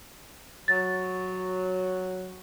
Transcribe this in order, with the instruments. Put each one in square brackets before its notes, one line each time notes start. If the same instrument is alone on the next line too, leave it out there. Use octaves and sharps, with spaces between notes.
[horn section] F#3 [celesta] A6